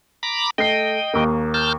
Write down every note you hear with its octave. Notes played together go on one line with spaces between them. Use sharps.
A#5 B5 D6
A3 D#5 G5 C7
D#2 A#3
A5 F6 G6